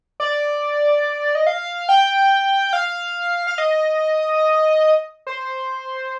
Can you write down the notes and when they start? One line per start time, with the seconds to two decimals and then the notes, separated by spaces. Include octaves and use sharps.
0.20 D5
1.35 D#5
1.47 F5
1.89 G5
2.73 F5
3.47 F5
3.58 D#5
5.27 C5